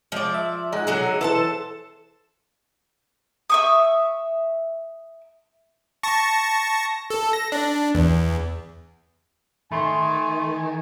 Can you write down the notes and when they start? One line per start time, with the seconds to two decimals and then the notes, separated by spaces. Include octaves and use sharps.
0.12 F3 G#3 D5
0.34 E5
0.73 G#3 D#4 F#5
0.87 D3 F#3 G#4
1.21 E3 A4 C5 A5
3.49 E5 C#6 D#6
6.03 A5 C#6 A#6
7.10 A4
7.33 A#6
7.52 D4
7.95 E2
9.72 D#3 A3 G#5 B5 C6